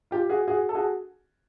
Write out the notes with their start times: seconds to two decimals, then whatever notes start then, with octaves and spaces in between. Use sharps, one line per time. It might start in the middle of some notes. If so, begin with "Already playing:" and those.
0.11 F4 G4
0.29 F#4 G#4
0.48 F#4 G#4
0.69 A4
0.75 F#4 G#4